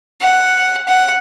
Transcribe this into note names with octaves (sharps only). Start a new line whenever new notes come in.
F#5
F#5